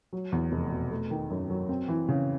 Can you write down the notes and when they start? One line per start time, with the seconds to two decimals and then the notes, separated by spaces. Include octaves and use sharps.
0.13 F#3
0.32 E2
0.52 F1
0.72 B2
0.91 A3
1.11 D#3
1.30 F#2
1.50 F#3
1.69 C4
1.88 E3
2.08 C#3